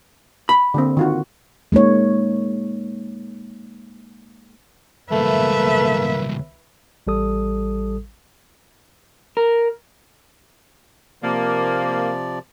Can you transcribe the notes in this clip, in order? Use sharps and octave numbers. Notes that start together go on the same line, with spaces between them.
B5
D3 A#3 C4
D#3 F4 F#4
G#3 A#3 D#4 C#5
C#2 G2 A3 A#3 B4 E5
A1 G3 A4 D#6
A#4
C3 F3 A#3 D5